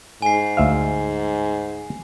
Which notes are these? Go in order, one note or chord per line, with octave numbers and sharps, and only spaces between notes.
G#2 G#5 C7
D2 E5 F5